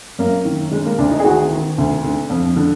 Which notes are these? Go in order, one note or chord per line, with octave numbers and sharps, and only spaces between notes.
F#2 A#3
D#3
D3 G#3
A#3
D2 D4
D#4
G#4
D#3 F#4
D#3
D2
D3
F2
D3